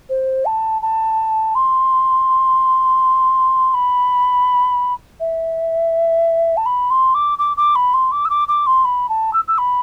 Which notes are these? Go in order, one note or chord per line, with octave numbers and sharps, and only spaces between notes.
C5
A5
A5
C6
B5
E5
A5
B5
C6
D6
D6
D6
B5
C6
D6
E6
D6
D6
C6
B5
A5
E6
E6
B5